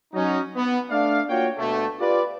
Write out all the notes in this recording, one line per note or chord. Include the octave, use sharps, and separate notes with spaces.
F#3 C#4 D#4
B3
A3 D4 D5 F5
A#3 F4 F#4 C#5 G5
D2 B2 D3 A3
F4 G4 B4 D5